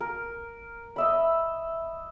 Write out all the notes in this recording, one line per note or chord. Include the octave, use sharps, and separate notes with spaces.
A#4
D#5 E5 B5